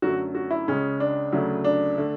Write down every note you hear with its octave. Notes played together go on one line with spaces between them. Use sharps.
F#2 D3 F#3 A3 F#4
F#4
E4
C#2 C#3 G#3 C#4
D4
D2 C#3 F#3 A3
D4
D3 A3